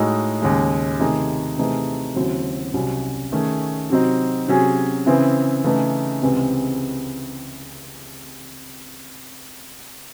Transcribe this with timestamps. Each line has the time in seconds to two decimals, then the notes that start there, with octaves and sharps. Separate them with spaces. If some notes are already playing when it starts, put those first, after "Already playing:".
Already playing: A2 G#3 D#4 F#4
0.42 D#2 C#3 G#3
1.00 C3 D#3 A3 D#4 G#4
1.58 C3 E3 A3 D#4 G#4
2.16 D#2 C#3 F#3 C4 E4
2.74 C2 C3 F#3 C#4
3.32 D#3 A3 C#4 G#4
3.90 C3 F#3 C4 D#4
4.48 C3 F#3 C#4 G#4
5.06 C#3 E3 C4 E4 G#4
5.64 C#3 E3 A3 D#4
6.22 C#2 C3 E3 G#3 C4